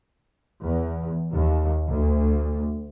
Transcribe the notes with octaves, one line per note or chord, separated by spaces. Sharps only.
E2
D#2
D2